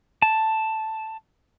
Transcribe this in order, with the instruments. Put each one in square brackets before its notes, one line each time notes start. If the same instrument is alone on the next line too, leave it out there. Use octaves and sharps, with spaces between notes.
[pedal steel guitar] A5